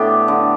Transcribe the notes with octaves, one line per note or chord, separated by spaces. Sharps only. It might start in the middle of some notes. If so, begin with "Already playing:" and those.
Already playing: A2 A3 B3 D4 G4
D3